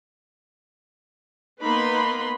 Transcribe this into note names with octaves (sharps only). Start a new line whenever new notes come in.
A#3 B3 D#4 B4 B5 C6